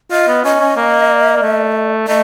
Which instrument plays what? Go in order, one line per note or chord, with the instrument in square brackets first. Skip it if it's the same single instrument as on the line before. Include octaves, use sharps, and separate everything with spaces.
[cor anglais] F4 [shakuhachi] D#5
[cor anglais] B3
[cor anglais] C#4 [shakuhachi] D#5
[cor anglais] C#4
A#3
A#3
A3
[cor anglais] A3 [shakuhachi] D#5